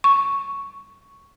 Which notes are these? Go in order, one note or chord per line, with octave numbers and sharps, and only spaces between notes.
C#6